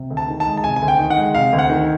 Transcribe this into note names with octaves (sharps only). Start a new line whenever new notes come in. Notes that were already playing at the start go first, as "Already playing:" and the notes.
Already playing: C3
D2
A5
D#3
A5
G#3
A5
C3 G#5
G#5
D2
G5
D#3
F#5
G#3
C3 F5
D2
F#5
D#3